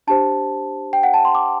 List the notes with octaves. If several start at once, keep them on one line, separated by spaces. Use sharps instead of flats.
D4 G4 C5 A5
G5
F#5
A5
C6
D6